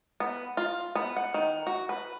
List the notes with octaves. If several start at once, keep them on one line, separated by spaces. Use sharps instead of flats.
B3
F4
B3
F#5
D#3
F#4
B4